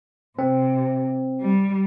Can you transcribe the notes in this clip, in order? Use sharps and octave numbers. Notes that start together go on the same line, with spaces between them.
C3 C4
G3